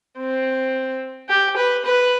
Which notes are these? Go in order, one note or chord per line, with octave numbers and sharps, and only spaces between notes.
C4
G4
B4
B4